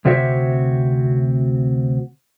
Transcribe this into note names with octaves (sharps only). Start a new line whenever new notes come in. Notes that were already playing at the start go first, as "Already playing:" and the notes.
D2 C3 C4 F#4 C#5 E5